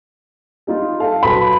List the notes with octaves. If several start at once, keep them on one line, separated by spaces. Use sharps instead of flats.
G3 D#4 F4
A4 F5
F#3 A4 B4 B5